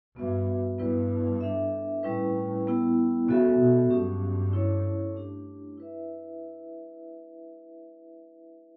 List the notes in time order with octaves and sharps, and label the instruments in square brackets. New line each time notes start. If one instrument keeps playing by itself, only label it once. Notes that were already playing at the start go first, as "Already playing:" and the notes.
[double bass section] G2 [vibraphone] B3 F#4 B4 E5
[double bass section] G2 [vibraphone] G3 B3 E4 B4
[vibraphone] D4 A4 E5
[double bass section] A2 [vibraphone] G3 C#4 E4 B4
[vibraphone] G3 B3 E4
[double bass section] C#3 [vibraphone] B3 F#4 A4 E5
[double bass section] B2
[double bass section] G2 [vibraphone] F#3 C#4 G4
[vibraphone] C#4 E4 A4 C#5
A3 D4 G4
E4 B4 E5